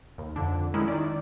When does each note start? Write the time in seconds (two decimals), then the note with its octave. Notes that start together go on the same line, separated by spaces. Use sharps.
0.18 D#2
0.36 F2 D3 D4
0.74 D#3 G#3 C#4 D#4 E4
0.88 D#3 D5